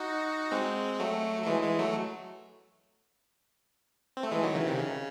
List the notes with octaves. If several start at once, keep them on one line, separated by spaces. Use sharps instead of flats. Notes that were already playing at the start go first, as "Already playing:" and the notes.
Already playing: D#4 F#4
G#3 C4
F#3 A3
F#3
E3 G#3
E3 G#3
F#3 A3
C4
A3
E3 G#3
D#3 F#3
C#3 E3
C3 D#3
C#3